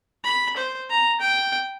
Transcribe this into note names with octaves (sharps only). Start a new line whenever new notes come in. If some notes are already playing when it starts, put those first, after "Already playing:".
B5
C5
A#5
G5